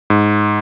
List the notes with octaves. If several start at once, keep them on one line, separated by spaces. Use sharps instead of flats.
G#2